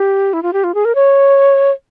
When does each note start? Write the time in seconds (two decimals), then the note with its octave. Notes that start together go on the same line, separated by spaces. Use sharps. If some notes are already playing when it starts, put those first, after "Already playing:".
Already playing: G4
0.33 E4
0.43 F4
0.53 G4
0.64 F4
0.75 G#4
0.85 A#4
0.95 C#5